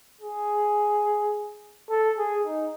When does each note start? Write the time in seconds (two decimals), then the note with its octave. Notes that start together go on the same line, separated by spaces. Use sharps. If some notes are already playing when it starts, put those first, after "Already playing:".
0.21 G#4
1.90 A4
2.18 G#4
2.47 D#4